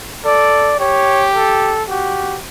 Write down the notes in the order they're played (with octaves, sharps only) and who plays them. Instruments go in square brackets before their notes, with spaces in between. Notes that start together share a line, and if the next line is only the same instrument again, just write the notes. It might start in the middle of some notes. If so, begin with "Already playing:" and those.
[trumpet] A4 [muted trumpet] D5
[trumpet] G4 [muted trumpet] C#5
[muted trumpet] A4
[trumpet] F#4 [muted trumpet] G4